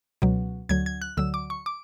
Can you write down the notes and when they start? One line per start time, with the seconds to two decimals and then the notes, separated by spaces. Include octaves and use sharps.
0.22 C#2 B2 F#3
0.69 D2 D3 F#3 G#6
0.86 G#6
1.02 F#6
1.17 D2 D3 F#3 E6
1.34 D6
1.50 C#6
1.66 D6